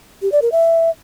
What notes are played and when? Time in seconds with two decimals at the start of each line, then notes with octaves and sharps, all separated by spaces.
0.22 G4
0.32 D5
0.42 A#4
0.52 E5